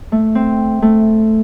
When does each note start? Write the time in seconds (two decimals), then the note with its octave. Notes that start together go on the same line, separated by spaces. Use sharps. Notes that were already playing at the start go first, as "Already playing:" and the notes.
0.12 A3
0.35 C4
0.82 A3